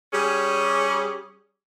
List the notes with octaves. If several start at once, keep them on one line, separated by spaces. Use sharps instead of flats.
G3 C#4 G#4